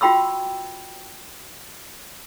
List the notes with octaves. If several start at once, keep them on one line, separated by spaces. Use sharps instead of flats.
F4 F#4 G5 B5 C#6 E6